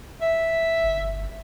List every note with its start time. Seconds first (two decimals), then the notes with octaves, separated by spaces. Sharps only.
0.22 E5
0.84 G1